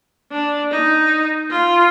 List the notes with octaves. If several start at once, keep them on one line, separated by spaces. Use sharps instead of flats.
D4
D#4
F4